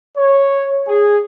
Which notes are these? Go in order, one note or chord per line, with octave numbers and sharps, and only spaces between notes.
C#5
G#4